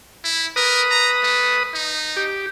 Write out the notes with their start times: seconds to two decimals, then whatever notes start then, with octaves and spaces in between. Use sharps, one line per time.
0.24 E4
0.56 A#4 B4 D#6
0.91 A#5
1.23 A3
1.74 D#4
2.17 G4